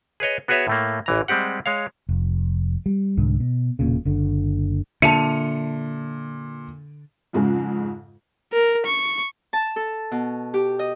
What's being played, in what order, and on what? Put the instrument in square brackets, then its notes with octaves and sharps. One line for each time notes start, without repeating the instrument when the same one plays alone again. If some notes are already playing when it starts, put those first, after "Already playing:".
[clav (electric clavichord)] G#4 B4 C#5 D#5
B3 F#4 G#4 B4 C#5 E5
A2 A3 A#3
A1 E3 A#5
G3 G#3 C4 G4 F#5
G#3 C#5 F5
[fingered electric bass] F1
G3
C2 G#2 D3
B2
E1 A#2 C#3
F#1 D3
[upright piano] A#2 [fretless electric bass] D3 [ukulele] E5 A5 [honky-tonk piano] C#7 D#7 F7
[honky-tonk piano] F2 G#2 C#3 F3 G#3
[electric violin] A#4
C#6
[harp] A5
A4
B2
G4
D#5